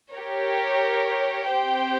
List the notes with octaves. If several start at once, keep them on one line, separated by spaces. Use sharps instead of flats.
G4 A#4 C#5
C4 G4 C5 G5